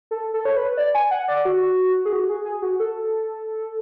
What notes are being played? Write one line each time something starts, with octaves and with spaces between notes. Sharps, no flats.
A4
A4
C#5
B4
D5
G#5
F#5
D5
F#4
G#4
F#4
G#4
G#4
F#4
A4